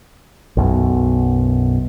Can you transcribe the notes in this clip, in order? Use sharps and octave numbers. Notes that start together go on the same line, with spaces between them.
B1 F#2 B2